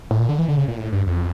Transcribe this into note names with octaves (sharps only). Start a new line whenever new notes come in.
A2
A#2
D3
E3
D3
C#3
A#2
A2
G2
F2